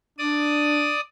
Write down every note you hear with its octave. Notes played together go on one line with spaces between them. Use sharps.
D4 D5 D#6